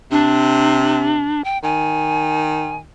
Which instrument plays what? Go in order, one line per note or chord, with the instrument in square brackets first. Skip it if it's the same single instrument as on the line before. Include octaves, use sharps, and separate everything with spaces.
[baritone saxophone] C3 [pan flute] D4
[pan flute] G5
[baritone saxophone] D#3 [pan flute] G#5